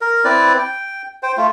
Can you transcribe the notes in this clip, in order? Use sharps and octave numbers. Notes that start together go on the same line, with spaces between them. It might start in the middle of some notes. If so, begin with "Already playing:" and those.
A#4
C4 E4 B4 D5
G5
C5 G5
A3 F4